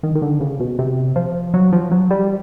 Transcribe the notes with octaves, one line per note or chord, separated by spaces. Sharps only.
D#3
D#3
D3
C#3
B2
C3
F3
F#3
F3
F#3
G3